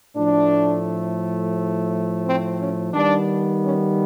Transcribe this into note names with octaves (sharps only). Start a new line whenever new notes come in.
A2 F3 A3 D4
C4
C#4
D#3 G3 B3 D4
C#4